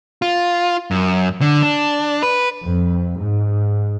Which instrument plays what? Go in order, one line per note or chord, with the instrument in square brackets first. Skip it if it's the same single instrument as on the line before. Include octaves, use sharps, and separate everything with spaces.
[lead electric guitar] F4
F#2
D3
D4
B4
[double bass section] F2
G#2